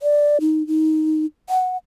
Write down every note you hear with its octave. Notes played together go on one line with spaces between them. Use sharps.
D5
D#4
D#4
F#5